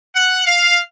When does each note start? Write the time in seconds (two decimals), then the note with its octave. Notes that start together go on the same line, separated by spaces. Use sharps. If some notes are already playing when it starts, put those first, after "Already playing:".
0.15 F#5
0.46 F5